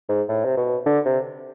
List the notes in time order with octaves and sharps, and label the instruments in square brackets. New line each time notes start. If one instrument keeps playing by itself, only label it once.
[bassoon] G#2
A2
C3
B2
D3
C3